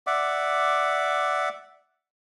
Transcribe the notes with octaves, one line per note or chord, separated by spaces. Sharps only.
D5 E5 F#5 D6